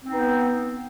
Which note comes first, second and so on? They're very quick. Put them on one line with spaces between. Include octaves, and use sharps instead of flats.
C4 D#4 B3